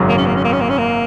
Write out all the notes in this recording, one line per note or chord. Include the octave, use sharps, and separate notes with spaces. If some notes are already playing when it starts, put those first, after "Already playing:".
Already playing: G#1 F#2 C#3 F#3
A#3
C#4
A#3
C#4
A#3
C#4
A#3
C#4
A#3